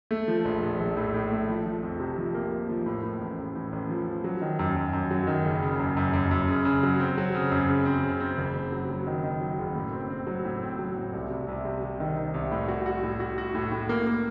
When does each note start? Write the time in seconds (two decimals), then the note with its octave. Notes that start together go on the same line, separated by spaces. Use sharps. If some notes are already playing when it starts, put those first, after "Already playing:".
0.11 A3
0.28 F3
0.45 A#1
0.63 A#1
0.80 A#1
0.97 A2
1.14 A2
1.31 A3
1.48 F3
1.66 F3
1.83 F2
2.00 C3
2.18 F3
2.34 A#3
2.52 A#3
2.69 F3
2.86 A2
3.03 A2
3.21 A1
3.38 A1
3.56 A2
3.72 A1
3.90 F3
4.07 F3
4.24 F#3
4.42 D#3
4.59 F#2
4.76 F#2
4.93 F#2
5.11 F#3
5.27 D#3
5.45 F#1
5.63 C#3
5.79 F#2
5.97 F#2
6.13 F#2
6.31 F#2
6.48 C#3
6.65 C#3
6.83 F#3
7.00 C4
7.18 F#3
7.35 C#3
7.51 F#2
7.69 C#3
7.85 C4
8.03 C#3
8.20 C4
8.38 F#1
8.55 F#1
8.72 F#3
8.90 F#3
9.07 D#3
9.24 D#3
9.41 F#3
9.59 F#1
9.75 A2
9.93 C4
10.10 C4
10.27 F#3
10.45 A2
10.62 C4
10.79 F#3
10.97 A2
11.13 C2
11.30 C3
11.48 C2
11.65 C3
11.83 C3
12.00 D#3
12.17 D#3
12.34 C2
12.51 A2
12.68 F#4
12.86 F#4
13.03 A2
13.20 F#4
13.38 F#4
13.55 A2
13.72 A2
13.89 A#3
14.07 A#3